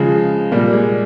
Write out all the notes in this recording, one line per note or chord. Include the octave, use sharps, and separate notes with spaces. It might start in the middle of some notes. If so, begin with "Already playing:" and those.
Already playing: C#3 F3 G#3
A#2 G3 A#3
G#3